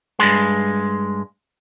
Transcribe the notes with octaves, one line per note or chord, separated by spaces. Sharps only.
G2 G#3